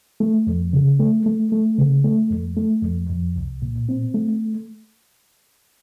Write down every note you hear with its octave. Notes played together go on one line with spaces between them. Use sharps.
A3
F2
C#3
A3
A3
A3
C#3
A3
F2
A3
F2
F2
C2
A#2
C4
A3